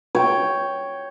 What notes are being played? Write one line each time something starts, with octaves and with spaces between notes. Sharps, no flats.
C#5 G5